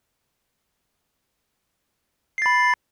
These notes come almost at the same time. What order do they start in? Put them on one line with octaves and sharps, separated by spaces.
C7 A6 B5